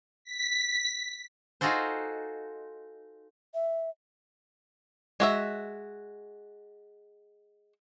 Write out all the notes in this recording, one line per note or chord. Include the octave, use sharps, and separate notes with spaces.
B6
D#4 F4 F#4 G#4 A4 C5
E5
G#3 F#4 E5